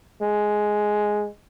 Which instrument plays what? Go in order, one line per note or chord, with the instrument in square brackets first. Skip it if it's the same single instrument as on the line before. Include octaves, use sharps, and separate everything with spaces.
[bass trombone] G#3